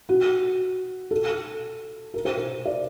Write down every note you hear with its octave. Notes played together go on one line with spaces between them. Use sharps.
F#4
A4
A#4
C5
A#4
D5